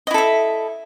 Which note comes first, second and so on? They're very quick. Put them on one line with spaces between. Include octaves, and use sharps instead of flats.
D#5 E4 A4 E5